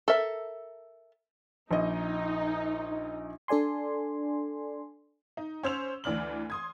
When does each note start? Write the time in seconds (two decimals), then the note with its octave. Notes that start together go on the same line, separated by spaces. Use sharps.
0.08 A4 A#4 E5
1.71 A#1 D#4 D#5
3.48 D4 A4 D5 G#5 C6
5.37 D#4
5.63 C#4 C5 E6 F7
6.04 D2 E3 D5 F6 F#7
6.50 C6 D#6 G#6